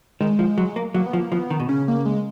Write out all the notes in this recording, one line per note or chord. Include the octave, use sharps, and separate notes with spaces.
D#3 G#3
F3
F#3
A#3
F#3 A#3
B3
F3
A#3
F3 B3
D#3
B2
C#3 C#4
A#3
G#3